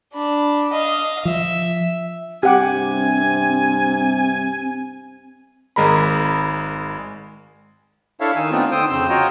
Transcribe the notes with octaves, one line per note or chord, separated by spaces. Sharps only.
D4 B5
D#5 F5
F3 E5
G2 C3 C4 G4 F#5 G#5 D6
G#1 G#3 A#4 A#5 B5
D4 E4 A4 C#5 E5 F5
D#3 D#4 G#5 E6
A3 B3 C4 D4 D#4 F4
D3 C5 G5 D#6 E6
F2 C#3 C4 E6 G6
F4 F#4 C#5 D#5 G5 A#5